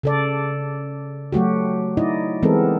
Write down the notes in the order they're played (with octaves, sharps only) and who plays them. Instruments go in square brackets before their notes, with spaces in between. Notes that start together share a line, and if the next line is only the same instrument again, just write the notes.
[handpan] C#3 A4 D5
F#3 A3 F#4 G4
D#4 E4 D5 D#5
E3 G#3 B3 C4 A4 A#4